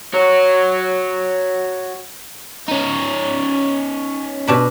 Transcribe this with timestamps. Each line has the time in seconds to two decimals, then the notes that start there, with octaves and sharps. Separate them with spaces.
0.14 F#4 C#5
2.68 C#4 D#4
4.47 B2 D4 B5